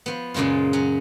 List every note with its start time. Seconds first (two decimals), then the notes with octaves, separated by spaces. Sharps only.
0.06 F3 B3
0.34 F#2 A#2 C#3 G#3 F4
0.73 F#3 C#4